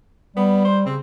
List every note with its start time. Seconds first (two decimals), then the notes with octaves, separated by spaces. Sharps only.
0.36 G3 B3
0.65 C5
0.86 C#3 C4